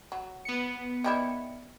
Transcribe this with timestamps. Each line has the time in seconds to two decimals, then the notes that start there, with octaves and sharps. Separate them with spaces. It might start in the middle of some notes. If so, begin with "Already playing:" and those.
0.12 F#3
0.45 B3 C#7
1.04 D#3 G3 E4